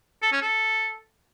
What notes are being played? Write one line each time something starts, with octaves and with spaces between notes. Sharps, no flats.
A4
C#4
A4